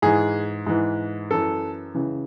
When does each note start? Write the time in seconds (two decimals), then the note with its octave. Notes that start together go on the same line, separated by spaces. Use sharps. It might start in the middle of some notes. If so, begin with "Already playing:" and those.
0.02 G#2 E3 G#4
0.66 G#2 E3
1.31 F#2 E3 A4
1.95 C#2 C#3 E3